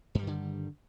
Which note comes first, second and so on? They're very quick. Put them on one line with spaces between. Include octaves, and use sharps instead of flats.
G2 G3 D#3 D3